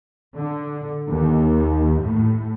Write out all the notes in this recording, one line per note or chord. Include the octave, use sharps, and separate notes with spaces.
D3
D#2
A2